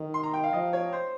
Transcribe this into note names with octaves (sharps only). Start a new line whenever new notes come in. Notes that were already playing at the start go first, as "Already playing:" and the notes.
Already playing: D#3
C6
A#5
G5
F5
F3 D#5
C#5
C5